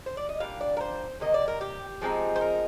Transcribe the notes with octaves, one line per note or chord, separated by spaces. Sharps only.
C5
D5
D#5
A#2 G3 D4 F5
D5
A#4
C5
C3 D#3 A#3 D#5
D5
A#4
G4
F3 G#3 C4 D#4
C5
A#4